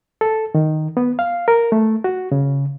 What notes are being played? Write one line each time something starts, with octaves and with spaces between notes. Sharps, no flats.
A4
D#3
B3
F5
A#4
A3
F#4
C#3